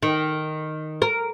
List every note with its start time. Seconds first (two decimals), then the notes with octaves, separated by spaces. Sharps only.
0.03 D#3
1.02 A#4